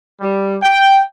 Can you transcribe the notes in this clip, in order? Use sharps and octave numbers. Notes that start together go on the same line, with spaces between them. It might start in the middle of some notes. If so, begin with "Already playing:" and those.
G3
G5